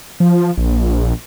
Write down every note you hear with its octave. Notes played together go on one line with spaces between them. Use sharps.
F3
A#1